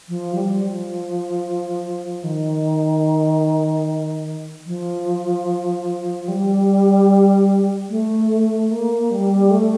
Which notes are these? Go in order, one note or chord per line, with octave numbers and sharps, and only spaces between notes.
F3
G3
F3
D#3
F3
G3
A3
A#3
G3
A3